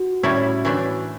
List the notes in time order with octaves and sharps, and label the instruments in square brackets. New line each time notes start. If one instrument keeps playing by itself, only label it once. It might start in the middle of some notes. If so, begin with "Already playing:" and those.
Already playing: [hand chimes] F#4
[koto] A2 G3 C#4 E4
A2 E3 A3 D4